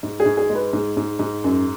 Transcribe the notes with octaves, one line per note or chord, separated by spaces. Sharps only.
G#2
G#4
G#2
G#4
G#3
B4
G#2
G#2
G#2
F#2